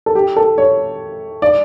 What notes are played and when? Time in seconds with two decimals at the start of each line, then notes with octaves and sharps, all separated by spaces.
0.06 A4
0.15 G4
0.37 A4
0.58 C#5
1.42 D5